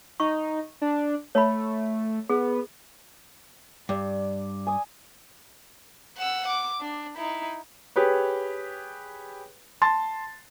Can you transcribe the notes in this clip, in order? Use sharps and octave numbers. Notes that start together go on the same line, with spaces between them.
D#4 C#6
D4
A3 C#5 B5
B3 G#4
G2 D5
G#5 D#6
F#5 E6
D6
D4
D#4 E4
G4 G#4 B4 C#5
A5 C6 A6